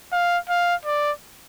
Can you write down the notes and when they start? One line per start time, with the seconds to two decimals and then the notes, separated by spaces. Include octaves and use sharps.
0.12 F5
0.49 F5
0.86 D5